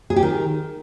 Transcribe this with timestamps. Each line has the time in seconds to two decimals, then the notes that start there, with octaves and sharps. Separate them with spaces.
0.10 G#4
0.16 G4
0.23 D#3